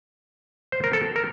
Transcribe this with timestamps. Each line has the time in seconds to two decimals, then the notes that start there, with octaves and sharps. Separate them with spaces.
0.72 C5
0.84 A#4
0.93 A4
1.16 A#4